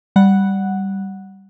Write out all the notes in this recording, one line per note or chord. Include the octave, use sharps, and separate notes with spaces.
G3 F#5 F#6